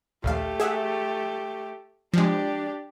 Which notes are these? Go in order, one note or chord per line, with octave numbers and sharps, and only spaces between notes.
A#1 D#2 A3 G4 F5
G#4 E5 F#5
F3 G#3 D4 G4